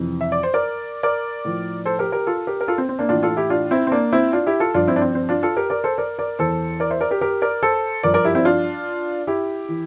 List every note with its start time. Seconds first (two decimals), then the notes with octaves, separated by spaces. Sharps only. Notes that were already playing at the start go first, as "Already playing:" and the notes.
Already playing: F2 C3 E3
0.21 E5
0.32 D5
0.43 C5
0.54 A#4 D5
1.03 A#4 D5
1.45 A2 F3
1.85 A4 C5
1.99 G4 A#4
2.12 G4 A#4
2.27 F4 A4
2.47 G4 A#4
2.61 A#4
2.68 F4 A4
2.78 C4
2.89 C4
2.99 A#3 D4
3.09 A2 E3 D4 F4
3.23 F4 A4
3.37 E4 G4
3.50 D4 F4
3.71 C4 E4
3.87 C4
3.92 A#3 D4
4.13 C4 E4
4.33 D4 F4
4.47 E4 G4
4.60 F4 A4
4.74 G2 F3 D4 F4
4.87 C4 E4
4.96 D4
5.01 C4
5.15 C4
5.29 D4 F4
5.43 F4 A4
5.57 G4 A#4
5.70 A#4 D5
5.84 A4 C5
5.98 A#4 D5
6.19 A#4 D5
6.39 E2 E3 A4 C5
6.80 A#4 D5
6.90 C5 E5
7.01 A#4 D5
7.11 G4 A#4
7.21 G4 A#4
7.42 A#4 D5
7.63 A4 C5
8.03 G2 F3 A#4 D5
8.14 A#4 D5
8.25 E4 G4
8.35 C4 E4
8.45 D4 F4
9.27 E4 G4
9.69 E3